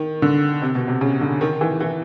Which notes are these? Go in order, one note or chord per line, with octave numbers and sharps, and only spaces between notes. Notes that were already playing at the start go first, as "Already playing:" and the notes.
Already playing: D#3
D3
C3
B2
C3
C#3
D3
D#3
E3
E3